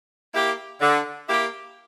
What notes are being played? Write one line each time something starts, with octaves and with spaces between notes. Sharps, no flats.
A#3 E4 G4
D3
A#3 E4 G4